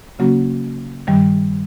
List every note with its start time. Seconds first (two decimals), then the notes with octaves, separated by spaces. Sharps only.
0.19 C#3 F#3 A#3 C#4 F#4
1.07 G2 D#3 G3